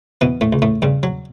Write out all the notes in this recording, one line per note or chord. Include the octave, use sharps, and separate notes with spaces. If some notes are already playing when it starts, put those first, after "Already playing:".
B2 E3 B3
A2 A3
C#2
A2 A3
G2 C#3 G3
F#3